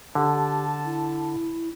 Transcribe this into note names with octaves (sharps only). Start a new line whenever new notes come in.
D3 G4 A5
E4